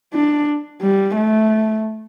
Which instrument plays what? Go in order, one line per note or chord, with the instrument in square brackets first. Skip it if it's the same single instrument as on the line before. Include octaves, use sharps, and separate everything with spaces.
[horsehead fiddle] D4
G3
A3